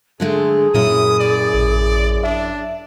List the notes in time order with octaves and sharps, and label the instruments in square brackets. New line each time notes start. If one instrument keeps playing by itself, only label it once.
[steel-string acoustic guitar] D3 G#3 A3 [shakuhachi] G#4
[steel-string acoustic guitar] F#2 E4 [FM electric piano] A#2 [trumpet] D#6
[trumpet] D5
[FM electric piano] A1
[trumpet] D4 [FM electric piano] E5